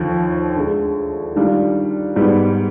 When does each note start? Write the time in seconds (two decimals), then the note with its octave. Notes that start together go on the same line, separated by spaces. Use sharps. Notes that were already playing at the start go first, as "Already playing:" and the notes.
Already playing: D#2 D3 F3
0.56 D2 D3 G#3
1.36 D#3 G3 D4 F4
2.16 G#2 G3 B3